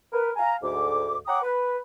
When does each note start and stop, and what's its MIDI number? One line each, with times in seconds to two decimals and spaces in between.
0.13 0.30 70
0.13 0.30 71
0.36 0.54 77
0.36 0.54 80
0.36 0.54 82
0.62 1.16 38
0.62 1.16 44
0.62 1.16 86
1.27 1.40 73
1.27 1.40 78
1.27 1.40 79
1.27 1.40 82
1.27 1.40 86
1.27 1.40 87
1.42 1.77 71